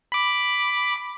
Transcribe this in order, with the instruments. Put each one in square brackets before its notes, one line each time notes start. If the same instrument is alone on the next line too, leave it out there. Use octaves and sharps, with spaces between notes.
[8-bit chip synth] B5 D6